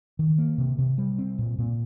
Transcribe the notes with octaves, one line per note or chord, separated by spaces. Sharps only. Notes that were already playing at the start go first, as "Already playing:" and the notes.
D#3
A#3
C3
C3
G3
C4
A#2
A#2